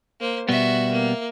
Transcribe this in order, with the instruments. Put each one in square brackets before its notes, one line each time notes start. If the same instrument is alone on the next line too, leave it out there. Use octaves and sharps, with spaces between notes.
[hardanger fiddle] A#3 C5
[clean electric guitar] B2 G3 B3 [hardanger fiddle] F#4 E5
[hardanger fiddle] A#3